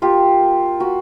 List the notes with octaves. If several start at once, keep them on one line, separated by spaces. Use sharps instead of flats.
A#3 F4 G4
A#3
A#3 F#4